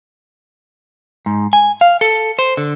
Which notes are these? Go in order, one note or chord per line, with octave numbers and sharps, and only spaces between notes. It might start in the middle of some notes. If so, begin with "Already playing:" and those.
G#2
G#5
F5
A4
C5
D3